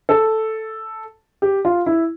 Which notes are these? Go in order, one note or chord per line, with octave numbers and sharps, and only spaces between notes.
A4
G4
F4
E4